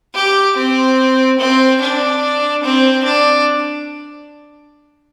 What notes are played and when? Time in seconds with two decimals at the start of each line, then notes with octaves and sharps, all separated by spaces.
0.15 G4
0.56 C4
1.39 C4
1.81 D4
2.64 C4
3.04 D4